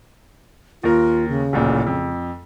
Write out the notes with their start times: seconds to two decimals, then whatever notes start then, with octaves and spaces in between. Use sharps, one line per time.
0.83 D#2 F4 A#4
1.29 C#3
1.53 D1 A1 A#2
1.86 F2